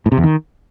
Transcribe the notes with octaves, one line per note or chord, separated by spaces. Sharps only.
A2
C3
E2
D#3